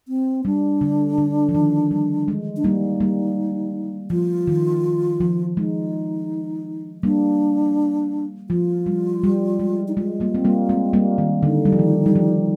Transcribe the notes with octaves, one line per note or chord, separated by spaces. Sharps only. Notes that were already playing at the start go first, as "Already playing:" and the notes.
C4
G3 D4
D3
D3
F3
D#3
G3
G#3
D4
G3 A#3 D#4
G3 A#3
F3 F4
D#3
F3
G#3 D#4
G3 A#3 D4
F3 F4
G3
G3
G#3
D#4
G#3 F4
G3 A#3
C4
G3 A#3
G#3 C4
G3 A#3
D#3
D3 D#4
G3
F3
D#3
G3
F3